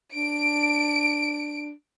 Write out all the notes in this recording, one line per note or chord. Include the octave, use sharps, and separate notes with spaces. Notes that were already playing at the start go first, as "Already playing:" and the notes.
D4 D7